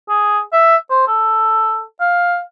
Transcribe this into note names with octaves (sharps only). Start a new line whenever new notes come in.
G#4
E5
C5
A4
F5